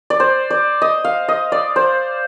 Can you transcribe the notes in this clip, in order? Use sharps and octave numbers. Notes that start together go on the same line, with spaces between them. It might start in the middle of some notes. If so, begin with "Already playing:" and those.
D5
C5
D5
D#5
F5
D#5
D5
C5